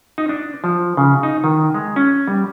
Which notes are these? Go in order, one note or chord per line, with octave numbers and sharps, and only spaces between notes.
D#4
D4
F3
C#3
D#4
D#3
G#3
C#4
G3